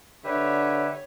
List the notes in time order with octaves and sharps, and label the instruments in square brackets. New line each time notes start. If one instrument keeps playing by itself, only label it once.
[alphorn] D3 [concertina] G4 B4 E5 [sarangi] C#5